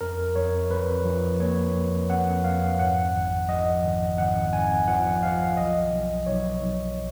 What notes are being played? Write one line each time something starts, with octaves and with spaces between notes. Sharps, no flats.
F2 A#4
F2 C#5
F2 B4
F3
A#3 C#5
F2
F2 F#5
F2 F5
G#2 F#5
G#1
F3 D#5
G#1
G#1 F#5
G#1 G#5
F3 F#5
F3 F5
B1 D#5
B1
B1 C#5
B1